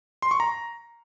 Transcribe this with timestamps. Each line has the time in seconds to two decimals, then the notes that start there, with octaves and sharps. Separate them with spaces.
0.22 C6
0.31 C#6
0.40 A#5